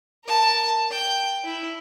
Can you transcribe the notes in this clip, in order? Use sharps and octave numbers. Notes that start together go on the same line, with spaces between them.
A#4 A5
G5
E4